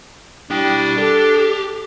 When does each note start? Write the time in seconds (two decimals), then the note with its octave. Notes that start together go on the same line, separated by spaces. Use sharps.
0.51 G3 D4 E4 G5
0.98 G4 A4